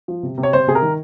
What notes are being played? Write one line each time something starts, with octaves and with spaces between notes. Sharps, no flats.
F3
C3
C3
C#5
C3 C5
C3 G#4
A#4
D#3